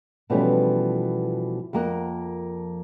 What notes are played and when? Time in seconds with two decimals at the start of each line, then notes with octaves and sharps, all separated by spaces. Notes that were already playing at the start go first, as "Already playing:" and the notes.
0.30 B2 E3 F3 G3 A3 C#4
1.73 F2 F3 A#3 A#4 F#5